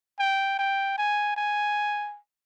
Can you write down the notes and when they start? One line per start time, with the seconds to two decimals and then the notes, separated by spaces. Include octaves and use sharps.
0.19 G5
0.59 G5
0.98 G#5
1.37 G#5